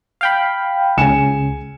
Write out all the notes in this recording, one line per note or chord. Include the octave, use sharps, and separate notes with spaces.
F5 G5 B5
C#2 C#3 G#5 C#7 E7